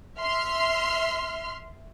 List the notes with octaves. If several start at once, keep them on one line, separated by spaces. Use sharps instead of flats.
E5 C6 F6